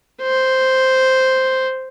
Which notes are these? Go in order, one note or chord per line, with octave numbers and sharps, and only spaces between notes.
C5